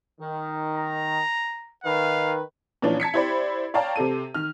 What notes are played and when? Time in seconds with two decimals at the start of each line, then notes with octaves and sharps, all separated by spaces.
0.20 D#3
0.77 A#5
1.84 D#3 B4 F5
2.82 A#2 E3 F3 C#4 D4
3.00 A5 G#6 B6 C#7
3.14 E4 G4 C5 D5 B5
3.74 C#5 D5 F5 G5 A5 A#5
3.96 C3 C4 A4 D#7
4.34 D#3 F6